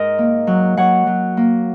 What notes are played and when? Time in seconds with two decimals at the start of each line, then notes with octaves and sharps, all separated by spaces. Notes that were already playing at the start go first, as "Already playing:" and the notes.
Already playing: G#2 A#4 D#5
0.18 A#3
0.47 F#3
0.77 F#3 C#5 F#5
1.07 F#3
1.37 A#3